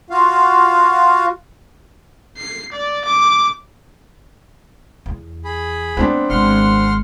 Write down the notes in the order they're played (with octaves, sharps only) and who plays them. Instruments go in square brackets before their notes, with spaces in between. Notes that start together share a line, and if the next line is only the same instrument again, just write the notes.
[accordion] F4 F#4 F5
[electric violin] C7
D5
D6
[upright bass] E2
[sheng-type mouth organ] G#4 B5
[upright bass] A3 D#4 [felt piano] B3 C4 D4
[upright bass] G#1 [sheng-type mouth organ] F#5 C6 F6